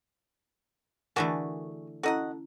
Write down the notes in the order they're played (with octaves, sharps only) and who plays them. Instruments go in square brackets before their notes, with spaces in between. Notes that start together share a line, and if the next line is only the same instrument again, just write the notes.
[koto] D3 E3 A3 [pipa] D4 F#4 G#4 [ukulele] A#4 A5
[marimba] C#4 E4 A#5 [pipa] F#4 D#5 F#5 [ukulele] A4